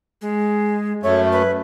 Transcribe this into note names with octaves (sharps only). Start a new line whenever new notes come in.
G#3
F#2 A3 C#5
B4